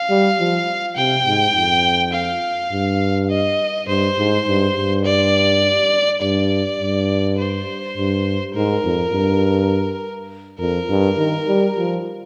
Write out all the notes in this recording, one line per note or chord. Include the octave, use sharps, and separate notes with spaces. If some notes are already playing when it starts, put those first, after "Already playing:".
Already playing: F5
G3
F3
C3 G5
G#2
F2
F5
G2
D#5
G2 C5
G#2
G2
G2
D5
G2 D5
G2
C5
G2
G#2 A#4
F2
G2
F2 A#4
G2
D#3
G3
F3